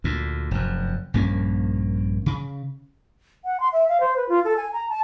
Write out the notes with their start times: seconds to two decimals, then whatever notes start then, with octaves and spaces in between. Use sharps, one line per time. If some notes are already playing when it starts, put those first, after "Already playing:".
0.04 D2 A#2
0.51 F1 F#2
1.14 A#1 G2 A#3 C#4
2.26 C#3
3.45 F#5
3.60 C6
3.73 E5
3.89 F5
4.00 C5
4.17 B4
4.29 F4
4.45 A4
4.57 G#5
4.73 A#5
4.89 A5